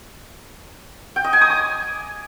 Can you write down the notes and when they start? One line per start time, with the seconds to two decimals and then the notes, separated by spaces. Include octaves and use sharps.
1.16 G5
1.24 D#5
1.33 G#5
1.41 D#6
1.50 D6